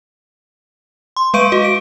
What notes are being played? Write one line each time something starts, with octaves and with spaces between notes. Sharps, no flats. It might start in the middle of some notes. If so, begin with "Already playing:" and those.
C6
G#3 B4 F5 C#6 D7 D#7
F#4 D#5
D7